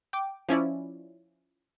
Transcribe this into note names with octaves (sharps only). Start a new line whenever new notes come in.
G5 D6
F3 C#4 E4 D5